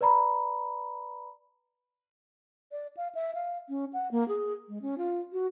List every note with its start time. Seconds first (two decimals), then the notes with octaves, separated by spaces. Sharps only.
0.01 B4 D5 A#5 B5
2.72 D5
2.97 F5
3.15 E5
3.35 F5
3.69 C#4
3.93 F#5
4.11 A#3
4.28 G#4
4.69 G#3
4.82 C#4
4.98 F4
5.33 F#4